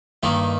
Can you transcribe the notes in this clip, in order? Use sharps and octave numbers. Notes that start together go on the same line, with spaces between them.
G2 D#3 A#3 D#4